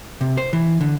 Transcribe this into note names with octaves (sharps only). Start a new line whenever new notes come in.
C3
C5
E3
D3